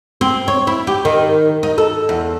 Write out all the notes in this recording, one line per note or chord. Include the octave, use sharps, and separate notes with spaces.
C4
C#5
E4
G4
D#3
D#4
A4
E2